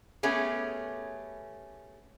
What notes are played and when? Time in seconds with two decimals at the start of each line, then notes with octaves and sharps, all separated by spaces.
0.23 A3 B3 C#4 G4 G#4